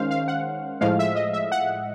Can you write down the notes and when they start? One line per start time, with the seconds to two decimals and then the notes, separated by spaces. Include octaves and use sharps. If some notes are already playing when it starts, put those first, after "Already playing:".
Already playing: D#3 G#3 C#4 C5 F5
0.11 F5
0.28 F#5
0.81 A2 F3 G#3 F5
0.99 E5
1.16 D#5
1.33 E5
1.52 F#5